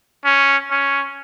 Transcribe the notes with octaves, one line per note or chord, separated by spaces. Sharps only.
C#4
C#4